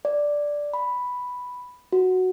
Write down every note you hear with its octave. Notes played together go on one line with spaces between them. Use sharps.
D5
B5
F#4